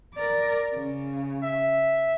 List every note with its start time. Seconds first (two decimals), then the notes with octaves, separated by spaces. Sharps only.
0.14 A#4 D5
0.76 C#3
1.43 E5